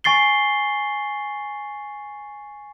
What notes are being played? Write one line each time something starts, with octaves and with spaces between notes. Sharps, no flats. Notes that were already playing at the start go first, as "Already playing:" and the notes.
G#5 C#6 A6 C7 G7